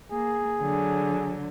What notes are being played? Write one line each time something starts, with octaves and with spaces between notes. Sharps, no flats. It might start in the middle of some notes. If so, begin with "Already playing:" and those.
A#3 G#4
D3 F#3